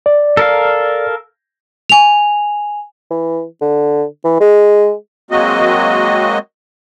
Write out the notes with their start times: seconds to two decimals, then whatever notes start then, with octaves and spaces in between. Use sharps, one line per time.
0.06 D5
0.37 A4 A#4 F5
1.90 G#5 F7
3.11 E3
3.61 D3
4.24 E3
4.40 G#3
5.31 F#3 G#3 A#3 C4 F#4 D#5